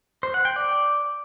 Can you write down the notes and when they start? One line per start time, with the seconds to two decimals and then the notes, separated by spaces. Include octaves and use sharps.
0.23 C5
0.34 F#5
0.45 G5
0.56 D5